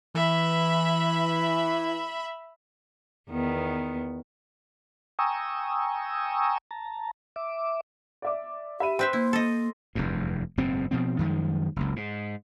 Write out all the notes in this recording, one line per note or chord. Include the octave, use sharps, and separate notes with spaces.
E3 E5 B5
E2 D#3 B3
G5 G#5 A#5 C#6 D#6 E6
A5 A#5
E5 D6
D5 E5 D6
G4 E5 B5 D#7
C4 B4 E5 C6 G6
A#3 E4
A4 D#5
F1 E2 G2
F#1 G#2 B2 C4
B2 F3 C4
F#2 D#3 F3 G#3
F#1 C#2
G#2